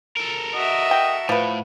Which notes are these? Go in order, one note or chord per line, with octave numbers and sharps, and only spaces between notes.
A4 A#4
F#4 D#5 E5
G5
A2 F3 B4